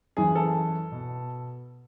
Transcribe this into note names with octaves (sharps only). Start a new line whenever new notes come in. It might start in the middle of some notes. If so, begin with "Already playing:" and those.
F#2 E3 G#4
A4
B2